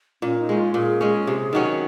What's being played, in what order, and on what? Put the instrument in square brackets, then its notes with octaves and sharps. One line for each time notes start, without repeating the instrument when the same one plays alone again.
[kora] A#2 [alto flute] C#4
[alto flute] D#4
[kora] G#3 C#4
[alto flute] F4
[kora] A#2 [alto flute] G#4
[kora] G#3 C#4
C3
D#3 F#3 C#4